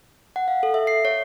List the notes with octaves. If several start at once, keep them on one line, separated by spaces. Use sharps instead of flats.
F#5
F5
A4
E5
C7
C#5